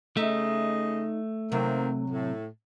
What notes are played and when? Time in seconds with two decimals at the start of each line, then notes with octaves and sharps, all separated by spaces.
0.17 C#3 A3 D#4 D#5 E5
1.52 C3 D#3 F#3 A#3 C4
2.09 A2